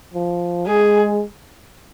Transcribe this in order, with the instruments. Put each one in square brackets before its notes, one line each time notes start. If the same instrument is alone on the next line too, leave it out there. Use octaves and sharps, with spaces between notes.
[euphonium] F3
[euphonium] G#3 [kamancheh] G#4